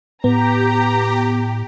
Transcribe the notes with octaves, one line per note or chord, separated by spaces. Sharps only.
A2 B3 G4 A#5